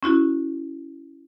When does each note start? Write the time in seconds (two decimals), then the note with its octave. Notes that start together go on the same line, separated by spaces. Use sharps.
0.03 C#4 E4 F#4